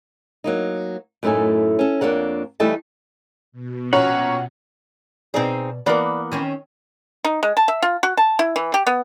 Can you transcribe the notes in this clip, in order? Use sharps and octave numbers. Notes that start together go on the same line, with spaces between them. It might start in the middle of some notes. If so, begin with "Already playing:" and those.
F#3 A#3 D#4
F#2 A2 A3 D#4 A4 G#5
C#4 A4
F2 A#3 D4 C#5 F#5
E3 G3 A3 D#4 A4 A5
B2
A#1 C#4 C#5 F#5 A#5
B2 C4 D#4 G#4 D5
E3 A#3 B3 A#4 D5
D#3 C4 C#4
D#4
G#3
A5
E5
F4
F#4
A5
E4
E3
G4
B3